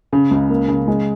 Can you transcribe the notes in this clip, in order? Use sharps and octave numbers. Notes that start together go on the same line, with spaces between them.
C#3
C#2
A#3
C#3
G#3